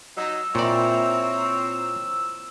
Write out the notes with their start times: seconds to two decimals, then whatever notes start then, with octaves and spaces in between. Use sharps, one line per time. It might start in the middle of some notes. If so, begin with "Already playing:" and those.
0.16 F#3 D#4 E6
0.55 A#2 F3 C4 E4 C#5 D5 A#5